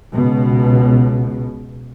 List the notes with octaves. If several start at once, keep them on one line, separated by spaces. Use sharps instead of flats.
C#2 B2